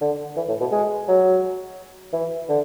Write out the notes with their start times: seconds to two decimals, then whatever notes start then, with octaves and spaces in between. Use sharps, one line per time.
0.01 D3
0.36 E3
0.49 A2
0.60 B2
0.72 G#3
1.08 F#3
2.13 E3
2.49 D3